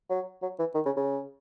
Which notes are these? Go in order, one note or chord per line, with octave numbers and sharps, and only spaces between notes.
F#3
F#3
E3
D#3
C#3
C#3